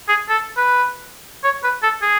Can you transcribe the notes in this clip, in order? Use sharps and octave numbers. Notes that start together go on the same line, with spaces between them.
G#4
A4
B4
C#5
B4
A4
G#4